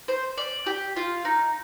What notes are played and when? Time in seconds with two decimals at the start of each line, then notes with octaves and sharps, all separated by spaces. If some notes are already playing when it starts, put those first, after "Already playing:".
0.08 C5
0.38 D5
0.66 G4
0.96 F4
1.25 D#4